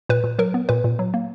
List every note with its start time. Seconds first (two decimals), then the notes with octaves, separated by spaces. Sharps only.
0.09 A#2 B4
0.24 A#2
0.39 F#3 A#4
0.54 B3
0.69 A#2 B4
0.84 A#2
0.99 F#3
1.14 A#3